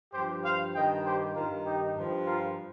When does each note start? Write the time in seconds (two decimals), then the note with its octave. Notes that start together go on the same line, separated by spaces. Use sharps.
0.13 G2 F3 G4 C5
0.44 C5 F5
0.75 G2 D#3 D#5 G5
1.05 G4 C5
1.35 G2 D#3 F4 A#4
1.66 D#4 G4
1.96 G2 F3
2.26 F4 A#4